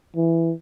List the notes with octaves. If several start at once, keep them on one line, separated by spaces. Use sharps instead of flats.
E3